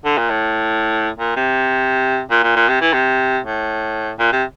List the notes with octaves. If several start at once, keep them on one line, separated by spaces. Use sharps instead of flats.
D3
A#2
A2
A#2
C3
A#2
A#2
A#2
C3
E3
C3
A2
A#2
C3